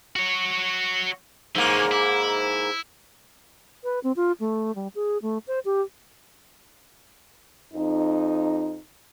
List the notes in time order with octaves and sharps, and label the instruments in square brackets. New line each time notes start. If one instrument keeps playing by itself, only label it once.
[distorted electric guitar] F#4 C#5
[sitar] G#2 A#3 [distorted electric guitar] E3 C#4
[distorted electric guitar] E4
[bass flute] B4
C4
F4
A3
G3
G#4
A3
C5
G4
[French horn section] F2 D#4